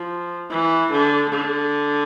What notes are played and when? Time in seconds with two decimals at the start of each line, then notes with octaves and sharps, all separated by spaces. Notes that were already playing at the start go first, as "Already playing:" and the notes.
Already playing: F3
0.51 E3
0.91 D3
1.30 D3